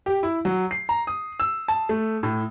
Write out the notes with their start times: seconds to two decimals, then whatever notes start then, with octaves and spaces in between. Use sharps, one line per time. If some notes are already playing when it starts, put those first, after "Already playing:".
0.06 G4
0.23 E4
0.45 F#3
0.71 C7
0.89 A#5
1.07 D#6
1.40 E6
1.68 A5
1.89 A3
2.23 A2